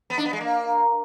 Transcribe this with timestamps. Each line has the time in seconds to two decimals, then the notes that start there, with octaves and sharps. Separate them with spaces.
0.10 B3
0.18 D4
0.25 B3
0.33 G#3
0.41 A#3